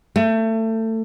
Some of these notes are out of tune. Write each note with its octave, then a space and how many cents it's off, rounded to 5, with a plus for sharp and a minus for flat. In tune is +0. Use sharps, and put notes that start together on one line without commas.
A3 +25